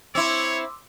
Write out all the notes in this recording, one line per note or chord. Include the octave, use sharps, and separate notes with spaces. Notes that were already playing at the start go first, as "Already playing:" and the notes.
C4 E4 C#5 C6 D6 E6